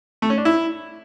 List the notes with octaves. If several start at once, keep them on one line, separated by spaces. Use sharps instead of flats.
A3
C#4
D4
E4